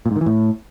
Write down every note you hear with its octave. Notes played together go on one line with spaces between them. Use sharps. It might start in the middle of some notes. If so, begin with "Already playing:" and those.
A#2
G#2
D#3
E3
A2